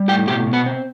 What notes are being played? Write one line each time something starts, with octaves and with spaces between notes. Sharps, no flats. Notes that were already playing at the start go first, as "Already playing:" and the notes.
Already playing: G3
A2 G4 G5
B2 G4 G5
B2
B3 B4
C4